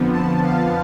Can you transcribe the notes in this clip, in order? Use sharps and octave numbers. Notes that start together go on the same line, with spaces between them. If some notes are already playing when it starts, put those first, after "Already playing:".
Already playing: F2 D3 F3 B3
A5
F5